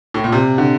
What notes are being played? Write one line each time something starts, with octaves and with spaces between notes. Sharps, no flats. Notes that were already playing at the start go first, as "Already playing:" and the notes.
A2
A#2
C3
D3